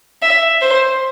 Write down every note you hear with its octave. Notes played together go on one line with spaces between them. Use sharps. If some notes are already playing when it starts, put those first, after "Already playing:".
E5
C5